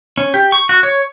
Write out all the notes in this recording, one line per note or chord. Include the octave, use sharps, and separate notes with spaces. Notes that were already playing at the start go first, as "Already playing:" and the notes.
C#4
G4
C#6
F#4
C#5